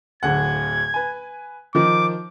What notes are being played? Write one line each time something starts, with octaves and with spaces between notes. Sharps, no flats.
D1 D2 F#5 G#6
B4 G#5
D#3 F3 D6